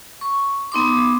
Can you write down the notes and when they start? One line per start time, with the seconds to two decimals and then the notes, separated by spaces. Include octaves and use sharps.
0.21 C#6
0.72 B3 D#4 C6 D6